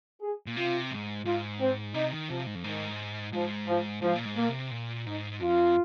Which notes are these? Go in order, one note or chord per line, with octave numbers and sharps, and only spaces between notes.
G#4
A#2
C3 F4
G#2
G#2 F4
C4
C3 D#4
D#3
C3 F3
G#2
F2
G#2 D#3
G#2 F3
F3
G#2 F3
A#2
G#2
A#2 A#3
C3
A#2
G#2 D#4
F2 F4